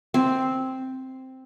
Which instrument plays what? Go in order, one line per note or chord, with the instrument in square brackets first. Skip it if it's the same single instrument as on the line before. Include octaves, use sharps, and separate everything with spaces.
[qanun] C4